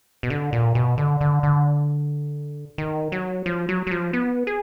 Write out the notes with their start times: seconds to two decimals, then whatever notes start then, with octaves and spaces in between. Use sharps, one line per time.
0.23 B2
0.30 D3
0.53 A#2
0.75 B2
0.98 D3
1.21 D3
1.43 D3
2.78 D#3
3.12 F#3
3.46 F3
3.69 F#3
3.87 F#3
3.91 F3
4.13 B3
4.47 G#4